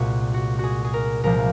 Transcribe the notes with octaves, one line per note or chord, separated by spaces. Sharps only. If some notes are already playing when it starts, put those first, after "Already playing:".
Already playing: C2 A#2 G#3 F#4 G#4
F#4
F#4 G#4
G#4
A#4
C2 A#2 F3 G#3 A#4